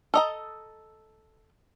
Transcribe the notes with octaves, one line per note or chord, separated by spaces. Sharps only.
A4 D#5 A#5